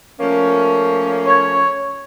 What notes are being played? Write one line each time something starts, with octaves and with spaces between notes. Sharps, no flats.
F3 A3 A#3 C#4
C#5 C#6 G#6